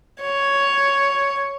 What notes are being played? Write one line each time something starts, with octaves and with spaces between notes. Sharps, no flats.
C#5